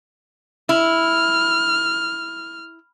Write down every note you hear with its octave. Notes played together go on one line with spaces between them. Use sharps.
E4 F6